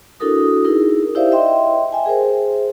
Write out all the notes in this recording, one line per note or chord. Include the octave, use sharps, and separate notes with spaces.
D4 E4 F#4 A4 A#4 D#6
D#4 E4 G#4 A#4
E4 G4 C5 D5 E5 F5
D#5 E5 G5 C6
E5 G5 G#5
G#4 A#4 C5